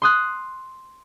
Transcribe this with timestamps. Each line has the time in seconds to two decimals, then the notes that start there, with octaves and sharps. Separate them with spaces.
0.02 C6 D#6 F#6